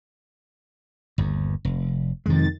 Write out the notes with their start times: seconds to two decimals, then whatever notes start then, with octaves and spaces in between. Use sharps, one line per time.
1.18 G1 D#2
1.65 F1
2.26 F2 C3 D#3 G#3 A6